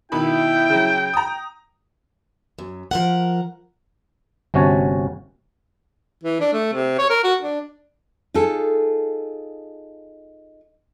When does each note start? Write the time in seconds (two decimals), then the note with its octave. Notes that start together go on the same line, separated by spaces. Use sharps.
0.12 B2 D#3 E4 G5 B5
0.70 C#3 F#3
1.14 A#5 D#6
2.59 F#2
2.91 F3 A#4 F#5
4.54 G1 C3 C#4 F#4 C#5 A5
6.23 E3
6.40 D4
6.53 A3
6.73 C3
6.98 C#5
7.10 A#4
7.24 F#4
7.41 D4
8.34 D#4 F4 G#4 A4